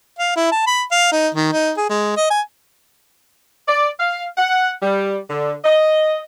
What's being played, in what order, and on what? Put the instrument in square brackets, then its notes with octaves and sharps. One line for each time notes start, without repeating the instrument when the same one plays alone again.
[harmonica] F5
E4
A5
B5
F5
D#4
D#3
D#4
G#4
G#3
D#5
G#5
[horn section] D5
F5
F#5
G3
D3
D#5